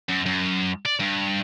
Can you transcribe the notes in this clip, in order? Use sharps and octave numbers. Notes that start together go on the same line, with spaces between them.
F#2
F#2
D5
G2